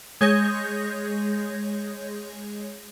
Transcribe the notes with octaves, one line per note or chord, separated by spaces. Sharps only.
G#3 G#4 C#5 G6 A#6